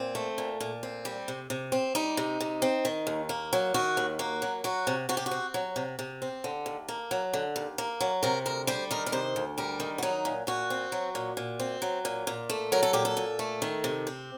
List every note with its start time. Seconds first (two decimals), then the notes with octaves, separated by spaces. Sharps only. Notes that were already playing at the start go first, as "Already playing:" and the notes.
Already playing: A#2 C4
0.15 A3
0.38 A#2
0.60 A#2
0.83 C4
1.05 G3
1.28 C3
1.50 C3
1.72 C4
1.95 G3 D#4
2.17 C3
2.40 C3
2.62 C4
2.85 D#3
3.07 D#2
3.29 A#3
3.53 F#3
3.74 D#3 F#4
3.97 D#2
4.19 A#3 F#4
4.42 F#3
4.64 F#3 F#4
4.87 C3
5.09 C3 F#4
5.17 G4
5.26 F#4
5.31 C4
5.54 F#3
5.76 C3
5.99 C3
6.22 C4
6.44 D3
6.66 D#2
6.89 A#3
7.11 F#3
7.34 D3
7.56 D#2
7.78 A#3
8.01 F#3
8.23 C3 A#4
8.46 D2 A#4
8.67 G3 C5
8.91 D#3 A#4
9.06 A#4
9.12 C3 C5
9.36 D2
9.58 G3 A#4
9.80 D#3
9.98 F#4
10.03 F#3 D#4
10.25 A#2
10.47 A#2 F#4
10.70 C4
10.92 F#3
11.15 A#2
11.37 A#2
11.59 C4
11.82 F#3
12.05 A#2
12.27 A#2
12.50 A3
12.72 F#3 A#4
12.83 A4
12.93 A#2 G4
13.05 A4
13.17 A#2
13.39 A3
13.62 D#3
13.84 C3
14.07 C4